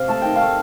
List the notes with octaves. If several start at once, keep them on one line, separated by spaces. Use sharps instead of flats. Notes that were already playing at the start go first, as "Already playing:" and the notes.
Already playing: C3 F5
A3 A5
D#3 G5
A3 F5